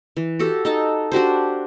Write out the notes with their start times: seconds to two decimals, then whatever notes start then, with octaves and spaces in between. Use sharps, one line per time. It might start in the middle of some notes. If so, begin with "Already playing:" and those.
0.16 E3
0.39 F#4 G4 A4
0.65 D#4 A4 A5
1.12 D4 F#4 G4 C5